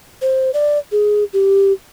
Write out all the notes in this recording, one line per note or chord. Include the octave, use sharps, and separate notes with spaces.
C5
D5
G#4
G4